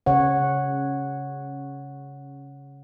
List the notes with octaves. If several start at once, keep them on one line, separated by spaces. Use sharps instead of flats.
C#3 C#5 F#5